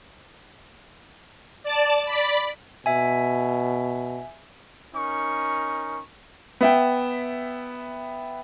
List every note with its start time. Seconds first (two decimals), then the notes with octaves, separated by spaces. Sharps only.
1.63 D5 A5
2.06 D5 B5
2.86 B2 E5 G#5
4.95 C#4 D#4 A#4 C#6
6.61 B3 E5 G5